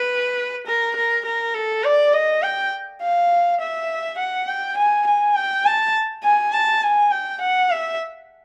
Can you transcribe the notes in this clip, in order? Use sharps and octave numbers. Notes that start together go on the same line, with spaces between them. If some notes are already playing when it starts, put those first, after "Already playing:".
Already playing: B4
A#4
A#4
A#4
A4
D5
D#5
G5
F5
E5
F#5
G5
G#5
G#5
G5
A5
G#5
A5
G#5
G5
F#5
E5